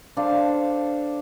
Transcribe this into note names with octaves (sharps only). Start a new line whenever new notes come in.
D4 A4 C5 F5